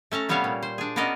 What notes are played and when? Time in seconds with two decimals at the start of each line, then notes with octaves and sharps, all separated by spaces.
0.12 A3 C#4 A5 A#5
0.29 C3 G3 B3 C#4 C#5 F5
0.44 A#2
0.63 C5
0.78 D4 G#4
0.96 B3 C#4 F#4 A#4 D5 D#5